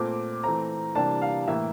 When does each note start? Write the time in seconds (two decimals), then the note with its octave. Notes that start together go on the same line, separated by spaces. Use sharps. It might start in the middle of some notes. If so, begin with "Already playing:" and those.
Already playing: A#2 A3 C4 D6
0.43 E3 A3 C4 A#5
0.95 C3 E3 G3 A#3 D4 A5
1.22 F5
1.47 A2 E3 A#3 E5